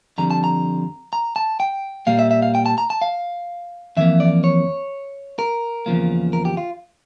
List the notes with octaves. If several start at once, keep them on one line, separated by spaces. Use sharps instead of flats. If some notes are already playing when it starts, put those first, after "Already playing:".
F2 D3 G3 A#5
A5
A#5
A#5
A5
G5
A#2 G3 A#3 F5
E5
E5
F5
G5
A5
A#5
A5
F5
F2 E3 A#3 E5
D5
C#5
A#4
E2 C#3 F3 A#3
A#4
G4
F4